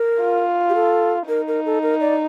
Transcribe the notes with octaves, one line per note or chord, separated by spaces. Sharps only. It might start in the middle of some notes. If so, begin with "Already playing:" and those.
Already playing: A#4
F4
G4
A4
D#4 A#4
A#4
A4
A#4
D5